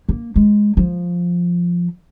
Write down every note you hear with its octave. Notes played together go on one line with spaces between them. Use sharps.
A#3
G#3
F3